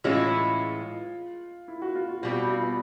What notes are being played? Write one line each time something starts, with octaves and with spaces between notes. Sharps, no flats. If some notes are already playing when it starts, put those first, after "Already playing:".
A2 E3 G#3 C#4 E4 F4
E4
F#4
F4
F4
B2 G3 C4 F4
F#4
F4
B3